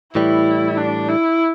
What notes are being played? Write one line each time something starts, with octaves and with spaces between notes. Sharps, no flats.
A2 E3 G3 E4
D4
E4